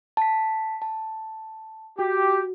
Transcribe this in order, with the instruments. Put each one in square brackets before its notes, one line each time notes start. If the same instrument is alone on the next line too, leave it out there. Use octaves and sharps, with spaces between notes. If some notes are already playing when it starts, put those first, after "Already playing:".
[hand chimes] A5 B6
A5
[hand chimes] F#4 [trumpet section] G4